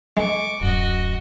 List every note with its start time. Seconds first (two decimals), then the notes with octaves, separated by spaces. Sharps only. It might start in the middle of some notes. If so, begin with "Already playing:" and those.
0.17 G#3 C#6 D6
0.61 D1 F#2 F#4 D#5